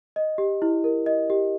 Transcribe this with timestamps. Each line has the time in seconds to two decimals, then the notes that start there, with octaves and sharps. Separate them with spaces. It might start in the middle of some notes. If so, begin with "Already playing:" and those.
0.16 D#5
0.38 G4
0.62 E4
0.84 A#4
1.06 D#5
1.30 G4